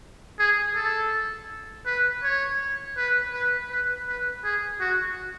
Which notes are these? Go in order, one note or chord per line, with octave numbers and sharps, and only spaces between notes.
G#4
A4
B4
C#5
B4
B4
B4
B4
G#4
F#4